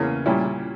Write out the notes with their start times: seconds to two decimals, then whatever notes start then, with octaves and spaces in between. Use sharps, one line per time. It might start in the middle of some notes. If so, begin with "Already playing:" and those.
Already playing: E2 C#3 E3 A#3 C#4
0.26 A#2 G3 C#4 E4